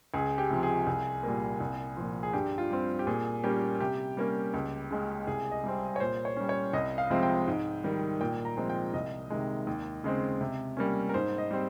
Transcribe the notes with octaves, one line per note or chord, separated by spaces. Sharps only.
C#2 G#4
G4
C3 F3
G#4
C2
A#2 G3 A#3
C2
A#2 F3
G#4
G2 G4
F4
G3 C4
G4
A#2 G#4
G3 A#3 C#4 G4
C3 G4
G3 A#3 C#4
C#2
C#3 G#3 C#4
C2 G#4
D#5
C3 G3 C4
C#5
A#2 C5
C#5
G3 C#4
C#5
C2 D#5
F5
C3 F3 G#3 C4
G5
G#2
D#3 G3
A#2 G5
A#5
F3 G#3 C4
G5
C2 D#5
C3 D#3 G#3
D#2
C#3 G#3 C4
C3
G3 A#3 C#4
A#4
G#2 C5
D#5
G3 C4